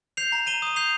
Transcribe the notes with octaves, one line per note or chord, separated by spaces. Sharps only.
G6 C7 F7
A#5
A#5 D#7 G7
D#6 D#7
G6 C7 F7